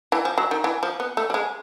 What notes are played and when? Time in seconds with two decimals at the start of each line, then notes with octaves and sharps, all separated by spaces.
0.12 E3
0.25 F3
0.38 F#3
0.51 D#3
0.64 E3
0.83 F3
1.00 B3
1.17 A3
1.30 G3
1.34 G#3